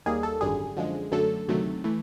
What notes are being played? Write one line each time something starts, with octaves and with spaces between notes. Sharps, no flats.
D#2 D#3 G3 A#3 G#4
A4
G#1 F#2 D3 G3 G#4
F#2 D3 F3 G#3
F#2 D3 F#3 A3 A4
D2 C3 D#3 F#3 A3
E3 A3